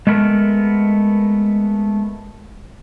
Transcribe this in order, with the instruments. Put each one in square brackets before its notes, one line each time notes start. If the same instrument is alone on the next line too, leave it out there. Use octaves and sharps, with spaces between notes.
[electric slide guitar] G#3 A3 B3 A#4